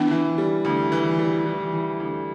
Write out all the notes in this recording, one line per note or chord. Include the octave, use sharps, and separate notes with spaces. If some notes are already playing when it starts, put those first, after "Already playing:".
Already playing: E3 B3 D4
E3
G3
D2
E3
G3
E3
E3
D2